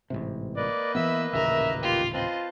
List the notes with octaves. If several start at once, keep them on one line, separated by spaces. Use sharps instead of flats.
A1 G#2 C3
A#3 B4 D5 D#5
E3 F#3 B3 E5 B5 E6
D#1 A1 C#3 A#4 E5
F4 G4
C4 F4 B4 C5 D#5 A5